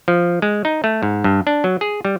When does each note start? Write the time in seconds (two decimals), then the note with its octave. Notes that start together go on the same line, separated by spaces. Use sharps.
0.08 F3
0.42 G#3
0.65 D#4
0.84 A3
1.03 G#2
1.24 G2
1.47 D4
1.64 F#3
1.81 G#4
2.05 G3